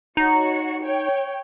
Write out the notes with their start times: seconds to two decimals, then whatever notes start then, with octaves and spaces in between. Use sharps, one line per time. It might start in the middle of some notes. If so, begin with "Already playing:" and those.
0.17 D#4 F#4 C#5 C#7
0.82 C#5 G5